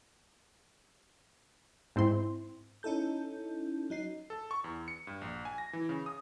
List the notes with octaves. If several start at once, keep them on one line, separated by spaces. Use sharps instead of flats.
G#2 C4 E4 C6
C#4 D#4 E4 A4 G6
F#3 D#4 C7
A4
C#6
E2
C#7
G2
A#1
G#5
A#6
E3
C#3
D#6